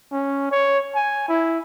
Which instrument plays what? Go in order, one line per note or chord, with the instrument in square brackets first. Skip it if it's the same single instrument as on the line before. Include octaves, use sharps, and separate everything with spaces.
[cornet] C#4
C#5
G#5
E4